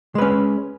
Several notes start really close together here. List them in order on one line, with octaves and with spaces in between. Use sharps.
G#3 B4 C#4